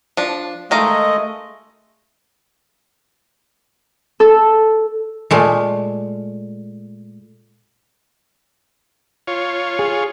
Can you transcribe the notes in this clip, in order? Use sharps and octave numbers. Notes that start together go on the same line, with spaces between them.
F3 D4
D#3 G#3 A3 D#5 F5 A#5
A4
A#2 G#3 A3
F4 C#5
G#4